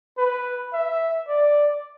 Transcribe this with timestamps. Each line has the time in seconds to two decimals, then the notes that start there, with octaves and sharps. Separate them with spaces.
0.18 B4
0.73 E5
1.28 D5